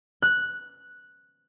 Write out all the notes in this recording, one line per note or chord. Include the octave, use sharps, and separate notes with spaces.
F#6